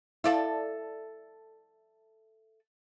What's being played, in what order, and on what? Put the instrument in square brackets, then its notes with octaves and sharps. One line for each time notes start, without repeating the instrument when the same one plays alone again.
[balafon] E4 F5 [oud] A4 D5 E5